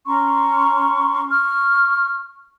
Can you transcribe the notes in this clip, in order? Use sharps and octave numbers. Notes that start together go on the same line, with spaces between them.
C#4 A#5 C6 C#6
C#6 F6